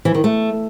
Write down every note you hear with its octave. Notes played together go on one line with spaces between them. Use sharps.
E3
D#3
A3